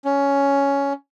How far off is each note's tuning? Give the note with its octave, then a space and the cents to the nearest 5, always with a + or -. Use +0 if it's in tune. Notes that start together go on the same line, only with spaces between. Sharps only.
C#4 +10